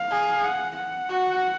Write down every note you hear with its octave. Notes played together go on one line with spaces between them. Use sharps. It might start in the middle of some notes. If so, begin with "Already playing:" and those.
Already playing: F5
G#4
F#5
F#5
F#4